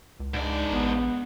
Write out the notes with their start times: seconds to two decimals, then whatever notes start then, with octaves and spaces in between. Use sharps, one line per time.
0.20 C#2
0.34 G#2 G#3 D4 D#4 D5
0.72 A1 B3